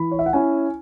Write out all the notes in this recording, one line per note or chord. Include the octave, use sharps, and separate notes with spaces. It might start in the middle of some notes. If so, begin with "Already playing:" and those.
Already playing: E3 B5
C#5
E5
F#5
C#4 E4 G#5